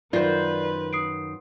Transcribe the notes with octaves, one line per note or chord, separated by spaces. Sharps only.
F#2 D#3 F4 B4 C5 D5 C7
D#6 C7 D7